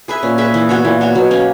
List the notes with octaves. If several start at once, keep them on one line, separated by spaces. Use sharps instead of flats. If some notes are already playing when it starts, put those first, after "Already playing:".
G#4 B4 E5
A#2 C#4
G#4 B4 E5
E3
B3 F#4 C#5
A#2 E3
B3 F#4 C#5
B2 F#3
A#3 C#4